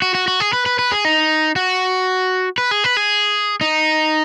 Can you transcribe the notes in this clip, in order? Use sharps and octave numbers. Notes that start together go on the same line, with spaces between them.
F#4
F#4
F#4
G#4
B4
B4
B4
G#4
D#4
F#4
B4
G#4
B4
G#4
D#4